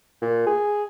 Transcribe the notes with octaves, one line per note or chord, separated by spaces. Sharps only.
A#2
G#4